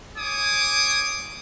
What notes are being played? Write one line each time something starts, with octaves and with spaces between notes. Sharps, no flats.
C#5 G#5 D6 D#6